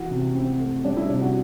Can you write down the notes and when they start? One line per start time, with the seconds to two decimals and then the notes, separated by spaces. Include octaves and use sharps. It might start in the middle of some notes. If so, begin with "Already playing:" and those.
Already playing: E3 F#4
0.11 C3
0.35 C4
0.60 A3
0.84 G3 D4
0.97 E4
1.09 C3 D4
1.22 F#4